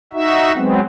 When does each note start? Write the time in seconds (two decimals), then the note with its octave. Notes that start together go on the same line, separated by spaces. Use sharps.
0.13 D#4 F#4 E5
0.56 F#3 G#3 B3 C4